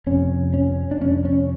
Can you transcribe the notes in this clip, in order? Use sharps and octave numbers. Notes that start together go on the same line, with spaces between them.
F2 C3 C#4
C#4
D4
F2 C3 C#4
C#4